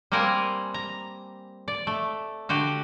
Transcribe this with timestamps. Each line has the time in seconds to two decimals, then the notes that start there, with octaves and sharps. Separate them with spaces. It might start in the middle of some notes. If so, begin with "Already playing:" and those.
0.12 G3 A#3 C4 A#4 F#5 G#5
0.74 A#5
1.68 D5
1.87 A3
2.49 D3 F#4 G4